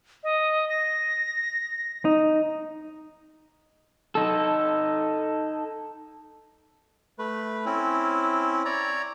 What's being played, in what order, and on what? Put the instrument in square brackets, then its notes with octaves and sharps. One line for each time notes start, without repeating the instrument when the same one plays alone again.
[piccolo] D#5
A#6
[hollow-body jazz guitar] D#4
[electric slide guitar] D#4 A4
[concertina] A3 B4
C4 C#4 E4
C#5 D5 A#5